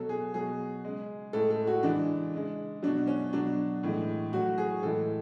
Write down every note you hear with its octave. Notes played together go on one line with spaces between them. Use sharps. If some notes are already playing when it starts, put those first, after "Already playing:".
Already playing: B2 F#3 A4
G#4
B2 F#3 G#4
C#3 G#3
A2 G#3 A4
A4
F#4
C#3 E3 G#3 D4
C#3 G#3
B2 F#3 D4
C#4
B2 F#3 D4
A2 E3 G#3
A2 F#3 F#4
G#4
A2 E3 G#3 A4